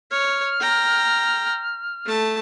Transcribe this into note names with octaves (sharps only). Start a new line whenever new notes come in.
C#5 F6
G5 A#5
A3 A5